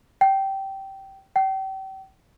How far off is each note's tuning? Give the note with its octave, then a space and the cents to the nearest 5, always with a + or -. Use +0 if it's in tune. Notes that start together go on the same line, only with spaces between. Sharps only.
G5 -15
G5 -35